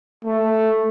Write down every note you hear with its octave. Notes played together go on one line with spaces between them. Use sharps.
A3